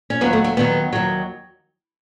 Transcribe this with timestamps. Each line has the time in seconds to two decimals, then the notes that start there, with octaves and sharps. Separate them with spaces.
0.10 C#4
0.21 D#2 D#3 F#3 B3
0.33 A3
0.44 A3
0.57 D#2 D#3 F#3 B3
0.93 D#2 D#3 F#3